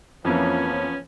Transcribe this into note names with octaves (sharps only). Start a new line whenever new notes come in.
F2 E3 F3 A#3 B3 C#4